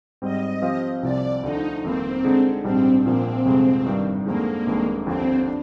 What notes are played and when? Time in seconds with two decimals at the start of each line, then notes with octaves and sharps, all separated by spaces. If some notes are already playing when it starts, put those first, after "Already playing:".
0.22 G#2 G3 C4 D#5
0.62 F3 C4 G4 C5 F5
1.02 C2 C3 F3 D5
1.43 D2 D3 F3 D#4
1.83 G1 F2 D#3 A#3 C4
2.24 D3 G#3 D#4 G#4
2.64 A#1 G#2 G3 C4 D4 G4
3.05 A#1 A#2 F3 A#3 C4
3.45 G1 F2 C3 F3 G#3
3.85 G#1 G2 D#3 G3
4.26 F2 D3 F3 G#3 A#3 D#4
4.67 G1 F2 D#3 G#3 D4
5.06 D#2 D3 F3 C4
5.48 D4